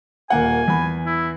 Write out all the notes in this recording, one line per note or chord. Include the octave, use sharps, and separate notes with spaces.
D#1 A#3 F#5 G#5
E2 B5
E4